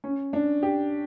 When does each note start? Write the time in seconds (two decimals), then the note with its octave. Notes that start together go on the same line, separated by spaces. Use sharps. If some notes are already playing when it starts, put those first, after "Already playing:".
0.04 C#4
0.33 D4
0.63 G4